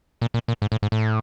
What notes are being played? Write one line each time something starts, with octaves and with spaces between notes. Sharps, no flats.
A#2
A#2
A#2
G#2
A2
G#2
A2